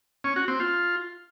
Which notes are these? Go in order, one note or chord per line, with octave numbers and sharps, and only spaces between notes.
C#4
F#4
C4
F4